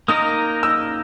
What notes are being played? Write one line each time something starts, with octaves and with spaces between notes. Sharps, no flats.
A#3 D#4 A#4 D#5 D#6
E6